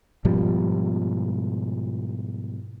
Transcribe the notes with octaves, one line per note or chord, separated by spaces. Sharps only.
G#2 B2 F3 G3